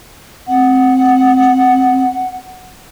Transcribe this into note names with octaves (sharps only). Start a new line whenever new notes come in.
C4 F#5